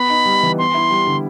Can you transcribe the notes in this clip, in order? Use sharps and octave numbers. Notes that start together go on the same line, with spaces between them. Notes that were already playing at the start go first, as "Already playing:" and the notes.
Already playing: B3 B5
D#4
G3
E3
B3 C6
E4
G3
D3